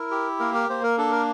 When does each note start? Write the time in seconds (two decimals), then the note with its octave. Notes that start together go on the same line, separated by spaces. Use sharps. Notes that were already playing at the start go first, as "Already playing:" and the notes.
Already playing: E4 A#4
0.11 G4
0.40 A#3 A#4
0.55 A#4
0.70 A#3 C5
0.83 A#4
0.98 D4 A4
1.12 A#4